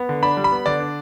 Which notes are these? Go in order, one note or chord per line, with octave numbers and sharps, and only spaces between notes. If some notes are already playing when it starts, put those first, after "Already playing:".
Already playing: B3
D3
D4 B5
G3
B5
B3
D3 D5
D4